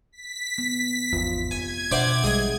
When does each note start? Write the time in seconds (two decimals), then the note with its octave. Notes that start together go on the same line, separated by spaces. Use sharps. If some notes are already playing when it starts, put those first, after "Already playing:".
0.12 B6
0.58 B3
1.13 G#1 E2 F4
1.51 F1 G#5 G#6
1.91 B2 D4 C5 D5 E5 F#5 G5
2.24 A#1 G3 G#3 G#4 D#5